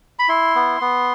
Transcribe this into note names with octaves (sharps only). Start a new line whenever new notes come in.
B5
E4 C6
B3
B3